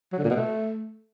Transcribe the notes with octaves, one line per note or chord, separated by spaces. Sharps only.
F#3
D3
A#2
B2
A3